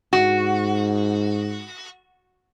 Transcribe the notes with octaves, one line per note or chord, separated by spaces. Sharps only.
G#2 F#4